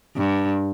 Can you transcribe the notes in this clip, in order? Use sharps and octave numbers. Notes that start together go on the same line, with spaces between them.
G2